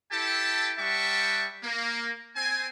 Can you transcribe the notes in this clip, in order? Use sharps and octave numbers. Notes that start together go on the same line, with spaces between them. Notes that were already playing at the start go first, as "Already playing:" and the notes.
E4 G4 A4 G5 A5
G3 E5 F#5 G5 A5 C#6
A#3
C4 G#5